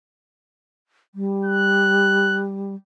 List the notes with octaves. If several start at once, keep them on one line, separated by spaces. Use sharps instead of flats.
G3
F#6